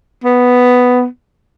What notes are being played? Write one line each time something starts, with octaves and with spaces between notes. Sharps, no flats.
B3